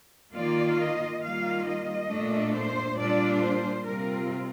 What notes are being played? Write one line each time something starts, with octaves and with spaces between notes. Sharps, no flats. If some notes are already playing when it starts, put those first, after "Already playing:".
D#3 A#3 F4 D5
D#5
D#3 G3 A#3 F4 F5
D#5
A#2 A3 D4
C5
A#2 G3 D4 F4 D5
C5
C3 G3 C4 F4 A#4